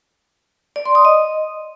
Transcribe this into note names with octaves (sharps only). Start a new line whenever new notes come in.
D5
C6
D#6
D#5